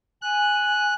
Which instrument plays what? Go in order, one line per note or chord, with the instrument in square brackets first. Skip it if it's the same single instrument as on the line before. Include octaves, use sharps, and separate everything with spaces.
[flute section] G#5 [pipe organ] F#6